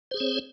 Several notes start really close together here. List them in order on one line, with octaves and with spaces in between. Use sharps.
C5 G#4 C#5 C4